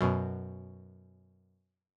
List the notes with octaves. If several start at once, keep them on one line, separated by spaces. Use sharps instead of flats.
F#2 B2